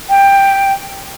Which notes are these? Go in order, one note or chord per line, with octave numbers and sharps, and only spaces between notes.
G5